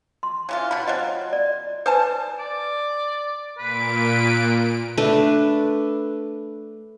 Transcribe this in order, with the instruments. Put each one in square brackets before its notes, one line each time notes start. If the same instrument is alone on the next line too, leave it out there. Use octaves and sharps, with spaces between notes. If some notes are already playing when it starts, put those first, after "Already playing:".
[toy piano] C6
[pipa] C#3 E3 F4
B2 B5
[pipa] F#3 C4 F4 [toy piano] D#5
[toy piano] D5
[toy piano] B4 D#6 [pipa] C5 G#5 A5
[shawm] D5
[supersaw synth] A#2 D7 [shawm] B4
[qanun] A3 D4 B4